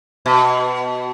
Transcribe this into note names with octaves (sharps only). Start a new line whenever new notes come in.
B2